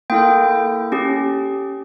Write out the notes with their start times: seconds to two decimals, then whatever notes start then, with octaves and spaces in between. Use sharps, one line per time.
0.10 A#3 E4 A4 G5
0.92 C#4 G4